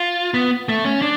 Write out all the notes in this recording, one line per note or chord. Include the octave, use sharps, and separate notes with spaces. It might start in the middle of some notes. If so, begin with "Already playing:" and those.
Already playing: F4
B3
A3
C#4
D4